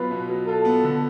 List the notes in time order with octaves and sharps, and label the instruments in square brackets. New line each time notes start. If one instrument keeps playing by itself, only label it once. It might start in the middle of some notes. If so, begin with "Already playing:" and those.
Already playing: [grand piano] B2 F#3 B3 F4 [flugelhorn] B4
[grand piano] B2
F#3
[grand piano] F4 [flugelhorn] A4
[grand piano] B3
D3